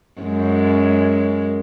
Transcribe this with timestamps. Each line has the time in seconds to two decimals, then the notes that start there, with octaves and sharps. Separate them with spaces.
0.22 F#2 G#3